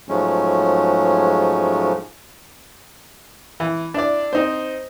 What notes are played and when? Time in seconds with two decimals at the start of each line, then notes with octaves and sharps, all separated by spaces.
0.09 G#2 F3 F#3 G#3 A3 C#4
3.60 E3
3.94 D4 E4 D5
4.33 C4 D#4 C5